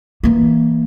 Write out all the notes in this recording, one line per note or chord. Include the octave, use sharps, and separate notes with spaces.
E3 A#3